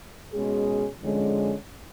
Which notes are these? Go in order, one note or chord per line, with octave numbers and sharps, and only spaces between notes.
B2 G#3 C#4 G#4
F2 D3 G#3 C#4